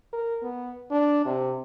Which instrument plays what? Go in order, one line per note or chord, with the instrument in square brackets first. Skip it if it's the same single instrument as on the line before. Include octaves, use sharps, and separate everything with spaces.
[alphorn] A#4
B3
D4
C3